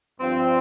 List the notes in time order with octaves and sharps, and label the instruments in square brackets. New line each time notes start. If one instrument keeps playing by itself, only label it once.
[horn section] G2 F3 C4